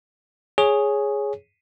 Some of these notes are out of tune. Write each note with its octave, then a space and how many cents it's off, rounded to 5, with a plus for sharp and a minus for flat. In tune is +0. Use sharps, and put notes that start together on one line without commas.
G#4 +0 C#5 +0